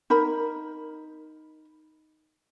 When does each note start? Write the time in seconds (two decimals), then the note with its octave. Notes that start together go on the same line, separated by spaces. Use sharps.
0.10 D#4 A#4 B5